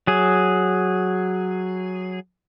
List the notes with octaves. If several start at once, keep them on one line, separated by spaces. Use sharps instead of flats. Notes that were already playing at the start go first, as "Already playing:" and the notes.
F#3 G#4